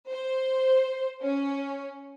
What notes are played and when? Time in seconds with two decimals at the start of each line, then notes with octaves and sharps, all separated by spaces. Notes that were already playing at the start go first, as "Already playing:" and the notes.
0.11 C5
1.23 C#4